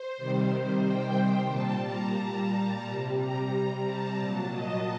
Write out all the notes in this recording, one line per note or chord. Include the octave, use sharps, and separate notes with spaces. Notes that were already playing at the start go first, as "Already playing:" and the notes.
Already playing: C5
C3 D#3 G3
G5
A#2 A5
G3
A#5
C3 G3
A#5
A5
A#2 F#3
D#5